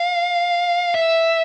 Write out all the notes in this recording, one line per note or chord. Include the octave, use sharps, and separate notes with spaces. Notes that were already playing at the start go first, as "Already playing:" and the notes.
Already playing: F5
E5